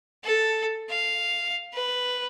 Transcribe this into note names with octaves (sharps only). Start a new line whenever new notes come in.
A4
F5
B4